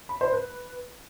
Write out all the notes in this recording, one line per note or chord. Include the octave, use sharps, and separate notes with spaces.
B5
C5
B4